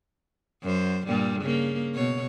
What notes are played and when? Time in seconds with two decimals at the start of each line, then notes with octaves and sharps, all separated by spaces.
0.64 F#2 C5
1.07 G2 A#2 G3
1.42 C#3 A#3
1.95 B2 C#5